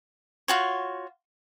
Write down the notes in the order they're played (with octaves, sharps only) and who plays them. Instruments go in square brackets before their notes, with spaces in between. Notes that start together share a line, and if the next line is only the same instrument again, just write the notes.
[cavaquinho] F4 F#4 C#5